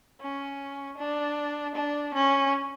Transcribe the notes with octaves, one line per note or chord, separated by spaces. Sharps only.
C#4
D4
D4
C#4